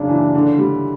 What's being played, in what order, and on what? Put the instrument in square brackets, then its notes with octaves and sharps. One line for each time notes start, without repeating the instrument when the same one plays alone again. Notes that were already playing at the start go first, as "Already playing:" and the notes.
Already playing: [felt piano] F#2 C#3 [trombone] D4
[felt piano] E3
D3
G3